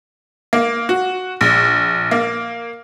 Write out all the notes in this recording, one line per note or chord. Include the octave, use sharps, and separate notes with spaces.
A#3
F#4
A#1
A#3